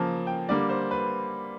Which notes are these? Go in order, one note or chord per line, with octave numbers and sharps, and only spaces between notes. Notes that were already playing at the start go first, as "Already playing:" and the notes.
Already playing: C#3 F3 A#3 A5
G5
D3 G3 A#3 D5
C5
B4